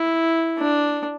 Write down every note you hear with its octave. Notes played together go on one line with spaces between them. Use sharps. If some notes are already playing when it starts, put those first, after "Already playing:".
Already playing: E4
D4